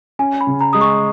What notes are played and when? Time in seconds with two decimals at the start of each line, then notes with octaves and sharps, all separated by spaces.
0.19 C#4 G#5
0.41 B5
0.47 C#3
0.61 A#5
0.73 G#3 D#6
0.81 C#6